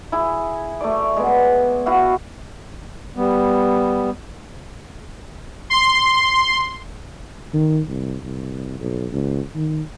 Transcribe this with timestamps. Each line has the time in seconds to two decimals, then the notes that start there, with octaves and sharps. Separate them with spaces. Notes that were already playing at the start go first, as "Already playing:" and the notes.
0.12 E4 G#4
0.81 A3 D5
1.16 G#3 B3
1.86 E4 F#4 F5
3.16 G3 B3
5.70 C6
7.53 D#3
7.88 C2
8.23 C2
8.80 B1
9.12 C#2
9.56 D#3